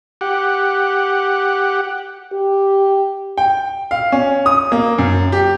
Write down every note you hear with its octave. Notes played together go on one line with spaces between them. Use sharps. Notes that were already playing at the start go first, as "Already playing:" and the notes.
G4 F#5
G4
G5
F5
C#4
D#6
A#3
F#2
G4